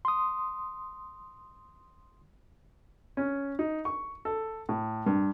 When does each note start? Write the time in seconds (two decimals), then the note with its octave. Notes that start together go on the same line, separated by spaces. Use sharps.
0.05 C6 D#6
3.17 C#4
3.59 D#4
3.85 C#6
4.25 A4
4.69 A2
5.06 G2